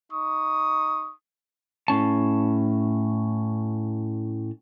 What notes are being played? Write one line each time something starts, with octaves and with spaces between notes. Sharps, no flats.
D#4 C#6 D#6
A2 C#4 A5